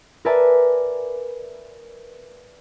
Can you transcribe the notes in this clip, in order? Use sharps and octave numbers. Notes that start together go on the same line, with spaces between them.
A#4 B4 D5 E5 G#5 A5